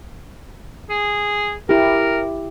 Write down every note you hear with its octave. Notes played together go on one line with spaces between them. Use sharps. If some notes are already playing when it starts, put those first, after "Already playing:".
G#4
E4 G4 A#4